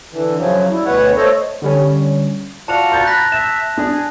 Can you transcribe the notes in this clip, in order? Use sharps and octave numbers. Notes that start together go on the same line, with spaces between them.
D3 E3
F#2 C#3 F3 F#3
G3 E4
D2 B2 B4 C#5 F#5
A3 A4 C5 C#5 D#5
D3 G3 C#4
F4 F#4 D5 F#5 A5 F7
A#5 G6 A6
B5 F#6 A#6
E5 E7
D4 G#4